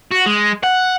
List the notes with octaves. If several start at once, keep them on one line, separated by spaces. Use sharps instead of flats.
F#4
G#3
F#5